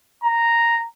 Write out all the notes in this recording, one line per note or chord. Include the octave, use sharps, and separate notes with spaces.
A#5